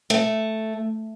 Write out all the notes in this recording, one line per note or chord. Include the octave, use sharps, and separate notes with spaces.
A3